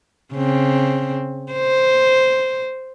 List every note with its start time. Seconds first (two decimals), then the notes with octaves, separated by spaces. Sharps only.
0.34 C#3 C4
1.52 C5